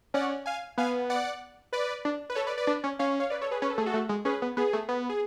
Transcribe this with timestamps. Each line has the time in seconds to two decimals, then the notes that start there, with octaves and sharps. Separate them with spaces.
0.14 C#4 D5 F#5
0.46 F5 G#5
0.78 B3 F5 G#5
1.10 D5 F#5
1.73 B4 D5
2.05 D4
2.30 B4
2.35 A4 C#5
2.47 B4 D5
2.58 B4 D5
2.67 D4
2.84 C#4
2.99 C#4 C#5 F5
3.20 C#5 F5
3.30 B4 D5
3.41 A4 C#5
3.51 G#4 B4
3.62 C#4 B4
3.70 A4
3.78 A3 G#4
3.86 F#4 A4
3.94 A3
4.09 G#3
4.25 C#4 G#4 B4
4.42 B3
4.57 B3 G#4
4.73 A3
4.89 B3
5.09 G#4